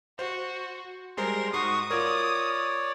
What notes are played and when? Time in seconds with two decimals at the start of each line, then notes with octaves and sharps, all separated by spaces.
0.19 F#4 C5
1.17 G3 G#3 A#4 C5 C6
1.53 G#2 F#4 C#6 D#6 C7
1.91 F4 A#4 C#5 D5